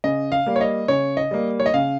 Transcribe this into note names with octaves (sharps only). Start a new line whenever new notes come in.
C#3 D#5
F5
G3 A#3
C#5
D#5
C#3 C#5
D#5
G3 A#3
C#5
D#5
C#3 F5